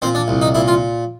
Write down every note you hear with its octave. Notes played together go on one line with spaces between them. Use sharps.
A#2 C4
D4
C2
D#4
A#2 E4
F4